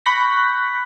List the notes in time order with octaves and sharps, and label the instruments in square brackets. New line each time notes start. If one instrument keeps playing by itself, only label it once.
[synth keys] B5 C#6 F#6 G6 A#6 B6